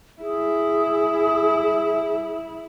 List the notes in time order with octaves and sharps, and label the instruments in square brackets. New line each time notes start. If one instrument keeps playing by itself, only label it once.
[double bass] E4 [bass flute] G#4